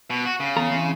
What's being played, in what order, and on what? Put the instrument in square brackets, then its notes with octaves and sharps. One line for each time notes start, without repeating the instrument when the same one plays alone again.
[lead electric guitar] B2
F#4
C#3
[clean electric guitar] E2 A4 A#5
E3 C4